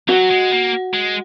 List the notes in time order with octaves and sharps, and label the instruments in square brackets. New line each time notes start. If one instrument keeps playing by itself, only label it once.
[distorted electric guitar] F#3 [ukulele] F#4
[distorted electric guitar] G#3
A#3
G#3